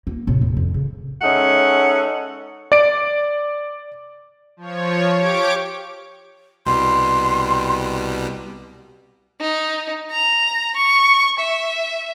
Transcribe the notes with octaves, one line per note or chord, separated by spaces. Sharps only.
A#3
A2 C3
D#2
F2
C#3
G#3 C#4 D#4 A4 E5 F#5
D5 D7
F3 C#5
G4 C#5 D6 D7
C2 B2 G3 C6
D#4
A#5
C#6
E5